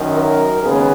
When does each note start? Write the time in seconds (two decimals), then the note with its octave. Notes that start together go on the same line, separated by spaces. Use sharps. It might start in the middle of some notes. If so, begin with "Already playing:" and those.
Already playing: F#2 D#3 F#3
0.15 A#4
0.63 D#2 C#3 G#3 B3 G#4